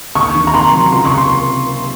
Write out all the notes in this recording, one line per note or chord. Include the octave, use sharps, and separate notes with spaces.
D#2 C#6
D#3
A#5
C3 C6
F#3
C#2 C6
C#6
C3
C6